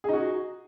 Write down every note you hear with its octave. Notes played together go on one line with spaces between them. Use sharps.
D#4 F#4 G#4